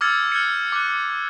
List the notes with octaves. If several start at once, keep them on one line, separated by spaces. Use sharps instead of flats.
D6 E6 F6 G#6 A6 C#7
F6 F#6 G#6 A6 C#7
F6
D6 F#6
D6